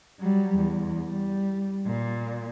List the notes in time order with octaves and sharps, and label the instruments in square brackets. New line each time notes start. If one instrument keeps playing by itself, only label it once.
[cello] F#3 G3
E2
G3
A#2